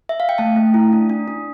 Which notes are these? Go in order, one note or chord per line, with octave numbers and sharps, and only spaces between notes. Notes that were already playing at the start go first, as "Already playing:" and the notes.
E5
F5
G5
A3 A5
A3
E4
D4
D4
D4